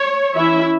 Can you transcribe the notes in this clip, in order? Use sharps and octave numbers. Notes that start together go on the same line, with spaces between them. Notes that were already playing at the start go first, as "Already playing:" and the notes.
Already playing: C#5
E3 C#4 E4 E5